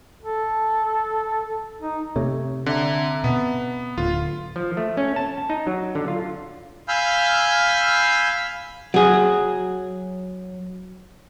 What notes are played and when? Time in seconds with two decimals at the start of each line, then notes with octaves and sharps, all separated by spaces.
0.23 A4
1.81 D#4
2.16 C3 A3 C#5
2.66 D3 C4 E5 A#5
3.24 B2 B3
3.98 D1 D3 F4
4.56 F3
4.77 A3
4.97 C#4
5.16 A5
5.50 D#4
5.67 F#3
5.95 D3
6.08 F4
6.88 F5 G#5 B5 E6 F6 G6
8.94 F#3 G#4